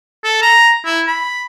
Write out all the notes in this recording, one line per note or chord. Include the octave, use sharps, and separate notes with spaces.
A4
A#5
E4
B5